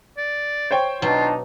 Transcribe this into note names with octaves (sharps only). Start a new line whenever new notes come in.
D5
C5 C#5 G5
B2 F#3 D4 D#4 F4